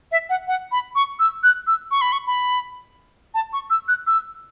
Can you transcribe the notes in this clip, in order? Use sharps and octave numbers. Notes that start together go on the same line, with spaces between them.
E5
F#5
F#5
B5
C#6
E6
F#6
E6
C#6
B5
C#6
B5
A5
C#6
E6
F#6
E6